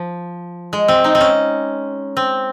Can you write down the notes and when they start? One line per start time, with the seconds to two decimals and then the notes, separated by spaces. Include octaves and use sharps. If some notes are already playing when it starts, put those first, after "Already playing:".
Already playing: F3
0.73 G#3
0.88 C4
1.04 D#4
1.15 C4
1.21 C#4
2.17 C4